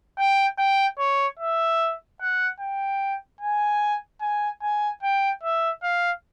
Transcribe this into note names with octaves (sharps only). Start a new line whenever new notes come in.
G5
G5
C#5
E5
F#5
G5
G#5
G#5
G#5
G5
E5
F5